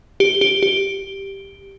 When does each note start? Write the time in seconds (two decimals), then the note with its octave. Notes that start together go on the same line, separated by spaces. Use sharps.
0.20 G4
0.41 G4
0.63 G4